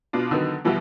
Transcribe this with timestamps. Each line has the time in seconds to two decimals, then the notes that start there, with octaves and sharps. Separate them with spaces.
0.13 B2 D4 F4
0.31 D3 D#3 F#3 B3
0.65 B2 E3 F3 G3 E4 F#4